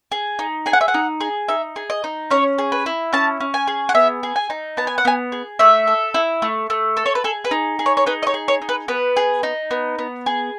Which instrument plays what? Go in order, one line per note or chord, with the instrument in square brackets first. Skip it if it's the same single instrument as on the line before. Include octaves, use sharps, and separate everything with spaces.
[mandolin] G#4
D#4
G#4 G#5
F#5
E5
F#5
D#4
G#4
D#4 E5
G#4
D#5
D#4
C#4 C#5
G#4
B4
E4
C#4 A5
C#4
G#5
G#4
F#5
B3 E5
G#4
G#5
D#4
B3 A5
G#5
F#5
B3 G#5
G#4
A3 E5
A4
E4
A3
A3
A4
C#5
B4
G#4 A4
B4
D#4
G#4
C#5
C#5
D#4 B4
D#5
C#5
G#4
C#5
D#4
B4
B3 B4
G#4
D#4
B3
B3
G#4